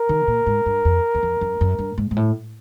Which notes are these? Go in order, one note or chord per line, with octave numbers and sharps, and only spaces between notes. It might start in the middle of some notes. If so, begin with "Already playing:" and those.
Already playing: A#4
D#3
A#2
G#2
G2
F2
E2
F2
F#2
F#2
G2
G#2
G#2
A2